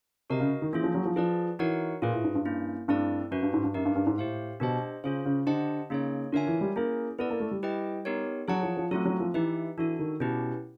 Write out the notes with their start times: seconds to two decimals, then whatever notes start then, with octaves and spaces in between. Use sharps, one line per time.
0.30 C3 F#4 A#4 D#5
0.40 C#3
0.62 D#3
0.73 E3 A#3 C#4 F4 G#4
0.83 F3
0.95 F#3
1.06 F3
1.16 F3 G#4 B4 D5
1.59 E3 D#4 F#4 A#4 C#5 F#5
2.02 A#2 F4 G#4 B4
2.13 A2
2.24 G#2
2.35 G2
2.45 A#3 C#4 E4
2.88 G2 A3 C4 E4 A4 D5
3.31 F#2 C#4 F#4 B4
3.43 G2
3.53 G#2
3.64 G2
3.74 F#2 D#4 G4 A#4
3.85 G2
3.95 G2
4.07 G#2
4.18 A2 G4 C5 F5
4.60 B2 D4 G4 C5 D#5
5.04 C#3 C#4 F4 G#4 C5
5.25 C#3
5.46 D3 G4 C5 D#5 F#5 A5
5.90 C#3 A#3 D#4 G#4 C#5
6.32 D3 F4 A#4 C#5 E5 G#5
6.47 E3
6.61 G3
6.76 A#3 C#4 E4 G#4
7.19 B3 E4 A4 D5
7.30 A#3
7.40 A3
7.51 G3
7.63 E4 G4 B4 D#5 G5
8.05 B3 D#4 G4 A#4 C#5
8.48 F#3 G#4 C#5 F#5 A5
8.63 F3
8.77 F3
8.91 F#3 A3 C4 F4 A4
9.05 F#3
9.20 F3
9.34 E3 D#4 G4 B4 E5
9.77 E3 D4 F#4 A4
9.99 D#3
10.20 B2 C#4 E4 G4 B4